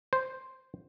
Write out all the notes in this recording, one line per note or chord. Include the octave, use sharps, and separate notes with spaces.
C5